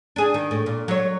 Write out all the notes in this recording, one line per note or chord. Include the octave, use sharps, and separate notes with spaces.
D4 G#4
D#3
A2
A#2
F#3 C#5